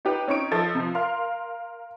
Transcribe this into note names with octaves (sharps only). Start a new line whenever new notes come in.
D#4 G4 B4
C4 C#4 D#4 C#6 D7
F3 A4 D#5 A6
C3 F3
A#4 F5 C6